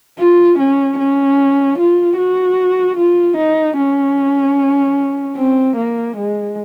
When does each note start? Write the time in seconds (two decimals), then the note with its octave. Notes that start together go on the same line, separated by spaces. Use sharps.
0.19 F4
0.59 C#4
0.99 C#4
1.78 F4
2.18 F#4
2.97 F4
3.37 D#4
3.77 C#4
5.37 C4
5.76 A#3
6.16 G#3